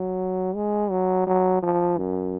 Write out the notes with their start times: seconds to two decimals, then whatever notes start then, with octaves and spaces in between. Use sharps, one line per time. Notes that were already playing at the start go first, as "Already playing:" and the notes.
Already playing: F#3
0.55 G#3
0.91 F#3
1.27 F#3
1.63 F3
1.98 F#2